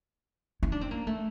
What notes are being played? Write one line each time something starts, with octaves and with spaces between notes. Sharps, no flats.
E4
D4
C4
A#3
A3